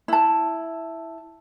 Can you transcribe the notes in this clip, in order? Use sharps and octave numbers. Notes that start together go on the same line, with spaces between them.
E4 A5